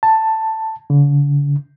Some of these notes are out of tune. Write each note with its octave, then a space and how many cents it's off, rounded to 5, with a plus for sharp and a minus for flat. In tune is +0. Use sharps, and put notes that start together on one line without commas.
A5 +10
D3 -45